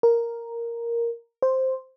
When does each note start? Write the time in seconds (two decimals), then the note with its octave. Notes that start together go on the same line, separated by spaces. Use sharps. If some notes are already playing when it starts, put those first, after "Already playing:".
0.03 A#4
1.42 C5